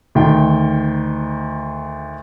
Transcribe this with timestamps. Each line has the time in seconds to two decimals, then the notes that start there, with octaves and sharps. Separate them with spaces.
0.15 D2 D#3 G5